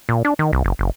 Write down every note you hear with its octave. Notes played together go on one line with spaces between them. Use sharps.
A#2
D4
D#3
C2
F#1
F#1